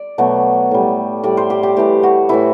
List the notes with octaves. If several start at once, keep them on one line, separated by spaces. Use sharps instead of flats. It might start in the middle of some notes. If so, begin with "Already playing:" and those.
Already playing: D5
B2 F#3 A3
A2 G3
A2 G3 D5
C5
G4
G4
A2 E3 A3 G4
F#4
A2 E3 A3 E4